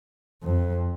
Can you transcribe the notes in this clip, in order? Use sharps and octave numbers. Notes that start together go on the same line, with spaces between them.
F2